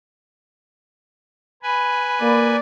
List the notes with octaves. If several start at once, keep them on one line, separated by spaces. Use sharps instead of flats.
B4 G#5 B5
A#3 D5